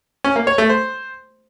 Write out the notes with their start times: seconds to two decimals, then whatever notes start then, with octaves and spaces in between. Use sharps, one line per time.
0.24 C#4
0.36 A#3
0.47 C#5
0.58 A3
0.69 C5